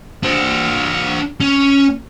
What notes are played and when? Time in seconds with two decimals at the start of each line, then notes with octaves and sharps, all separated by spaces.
0.23 D4 C5
1.40 C#4